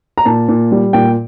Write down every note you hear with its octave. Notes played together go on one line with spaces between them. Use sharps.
A#5
A#2 A5
A#2
G3
A#2 G5